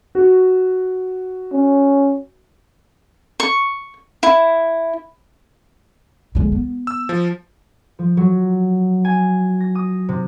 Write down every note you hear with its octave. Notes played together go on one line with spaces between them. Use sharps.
F#4
C#4
C#6
E4
D3 G#3
B3
E6
F3
F3
F#3
G#5
A#6
D#6
C3